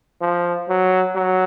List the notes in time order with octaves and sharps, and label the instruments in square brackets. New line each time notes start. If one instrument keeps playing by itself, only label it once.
[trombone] F3
F#3
F#3